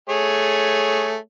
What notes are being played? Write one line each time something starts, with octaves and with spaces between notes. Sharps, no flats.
A3 G#4 C#5